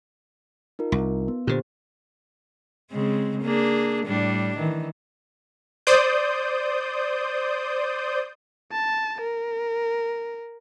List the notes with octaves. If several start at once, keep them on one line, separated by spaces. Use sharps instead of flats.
D#4 F4 A#4
C2
B3
A#2 D3 G4 C5
C#3 G#3 C4
A#3 D4 G#4
A2 G3 D4
D#3 E3
C5 D5 D#6 G6
A5
A#4